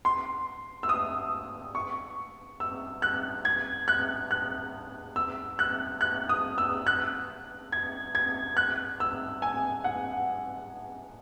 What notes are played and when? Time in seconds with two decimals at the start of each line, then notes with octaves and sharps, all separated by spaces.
0.05 C6
0.83 E6
0.89 D#6
1.75 C#6
2.60 E6
3.02 F#6
3.45 G#6
3.88 F#6
4.31 F#6
5.16 E6
5.59 F#6
6.01 F#6
6.29 D#6
6.58 E6
6.87 F#6
7.72 G#6
8.15 G#6
8.57 F#6
9.00 E6
9.42 G#5
9.84 F#5